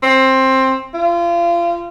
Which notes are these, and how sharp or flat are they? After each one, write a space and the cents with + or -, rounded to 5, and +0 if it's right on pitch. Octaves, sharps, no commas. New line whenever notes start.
C4 +15
F4 -30